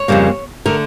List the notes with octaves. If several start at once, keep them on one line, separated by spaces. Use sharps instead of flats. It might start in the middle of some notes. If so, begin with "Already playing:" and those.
Already playing: C#5
F2 C#3 G3 A#3
D3 A3 A#4